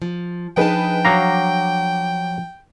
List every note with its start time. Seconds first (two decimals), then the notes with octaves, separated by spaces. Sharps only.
0.02 F3
0.57 F3 D4 D#4 G#4 B4 G5 A5
1.05 F#3 F5 A#5 D6 A#6